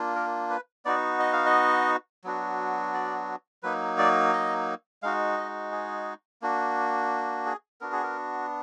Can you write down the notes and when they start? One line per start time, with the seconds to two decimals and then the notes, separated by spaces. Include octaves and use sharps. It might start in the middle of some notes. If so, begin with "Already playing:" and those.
Already playing: A#3 D4 F4
0.15 A#4
0.50 B4
0.85 B3 D#4 F#4 D5
1.19 D#5
1.33 F5
1.46 D#5
2.24 F#3 B3 D4 F#4
2.94 D5
3.63 F#3 A#3 D#4 B4
3.98 D5
4.33 D#5
5.03 G#3 D#4 F#4 F5
5.37 D#5
5.72 G#4
6.42 A#3 D4 F#4
7.46 G#4
7.81 B3 D4 F#4 A#4
7.92 G#4
8.03 A#4